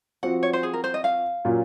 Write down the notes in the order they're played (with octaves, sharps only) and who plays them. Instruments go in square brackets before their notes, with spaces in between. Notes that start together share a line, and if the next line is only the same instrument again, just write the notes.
[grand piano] F3 C4 F#4 [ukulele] F#5
[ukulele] C#5
C5
G#4
A#4
C5
D#5
F5
[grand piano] A#2 F#3 C#4 F4